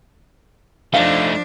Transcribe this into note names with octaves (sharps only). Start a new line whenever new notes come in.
F3 A3 D4 D#4 F5